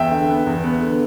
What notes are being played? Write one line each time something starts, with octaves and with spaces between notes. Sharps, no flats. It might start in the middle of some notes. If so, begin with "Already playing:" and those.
Already playing: E2 E5 G5
D3
B3
E2
B3
D3